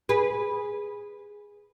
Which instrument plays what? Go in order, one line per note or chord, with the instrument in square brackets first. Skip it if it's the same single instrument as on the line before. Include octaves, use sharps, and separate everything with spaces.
[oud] G#4 B4